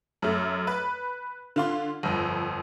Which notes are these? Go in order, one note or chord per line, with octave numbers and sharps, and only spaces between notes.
F#2 A3
B4
D3 F4 C6
G1 F2